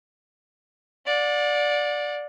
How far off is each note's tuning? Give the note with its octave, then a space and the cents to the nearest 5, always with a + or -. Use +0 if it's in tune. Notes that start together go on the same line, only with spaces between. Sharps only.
D5 +0 F#5 -40